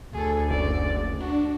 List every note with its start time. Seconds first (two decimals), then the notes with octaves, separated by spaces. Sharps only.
0.13 D2 G#4 A4
0.50 F#1 D5
1.20 D4 F#4